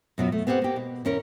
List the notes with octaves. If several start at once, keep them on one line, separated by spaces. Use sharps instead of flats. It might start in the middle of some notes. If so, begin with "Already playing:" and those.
F#2 B2 F#3 F4
A3
B3 C4 G4 E5 F#5
A#3 G4
B2
E2 C#4 A#4